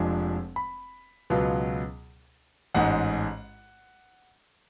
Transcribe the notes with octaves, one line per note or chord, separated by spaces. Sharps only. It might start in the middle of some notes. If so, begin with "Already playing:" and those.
Already playing: F1 F2 F3 G#3 D4 G#5
B5
C#2 B2 F#3 B3 F4
A1 G#2 G#3 F#5